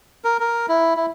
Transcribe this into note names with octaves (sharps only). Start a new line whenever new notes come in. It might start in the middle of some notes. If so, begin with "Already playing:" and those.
A#4
A#4
E4
E4